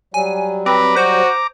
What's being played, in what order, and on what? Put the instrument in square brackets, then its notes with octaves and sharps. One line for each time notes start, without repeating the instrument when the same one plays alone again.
[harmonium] F#3 G3 [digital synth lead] G#5
[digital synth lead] C4 [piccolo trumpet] B4 [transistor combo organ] A#5 D6
[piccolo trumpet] F#4 [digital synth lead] C5